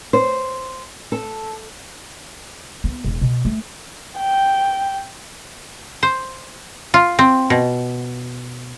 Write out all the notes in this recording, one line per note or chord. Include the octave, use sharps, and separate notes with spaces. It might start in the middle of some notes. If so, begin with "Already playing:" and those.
C5
A4
B3
E1
B2
A3
G5
C5
F4
C4
B2